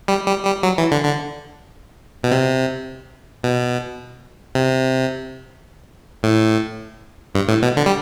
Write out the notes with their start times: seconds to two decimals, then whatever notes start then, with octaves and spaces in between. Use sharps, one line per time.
0.08 G3
0.27 G3
0.45 G3
0.63 F#3
0.78 E3
0.92 D3
1.05 D3
2.23 B2
2.32 C3
3.43 B2
4.55 C3
6.23 A2
7.35 G2
7.48 A2
7.63 B2
7.77 D3
7.86 G3